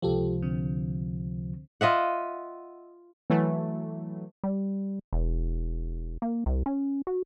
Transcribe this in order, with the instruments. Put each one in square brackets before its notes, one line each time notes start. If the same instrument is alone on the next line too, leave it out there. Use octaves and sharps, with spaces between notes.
[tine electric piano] C#2 C3 F3 [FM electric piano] F4 G4 A4
[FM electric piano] D3 C4
[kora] F4 D#5 E5 F#5
[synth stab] E3 F#3 A3
[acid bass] G3
E1
A#3
C2
C#4
F#4